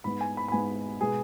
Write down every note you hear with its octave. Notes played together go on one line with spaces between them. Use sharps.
G#2 G#3 B3 B5
G#5
B5
B5
G#2 G#3 B3 G#5
B2 G#3 B3 G#4